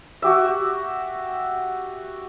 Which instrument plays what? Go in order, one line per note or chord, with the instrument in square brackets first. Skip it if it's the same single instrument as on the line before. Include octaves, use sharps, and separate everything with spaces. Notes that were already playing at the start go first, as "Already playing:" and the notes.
[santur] F#4 G4 E5